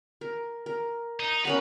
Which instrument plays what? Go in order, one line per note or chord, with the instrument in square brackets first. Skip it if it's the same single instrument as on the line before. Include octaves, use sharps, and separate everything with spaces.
[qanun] A#4
A#4
[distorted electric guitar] D#4
[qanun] C#4 A#4 F#5 [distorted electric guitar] B4